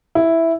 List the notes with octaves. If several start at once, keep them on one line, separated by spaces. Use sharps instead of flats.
E4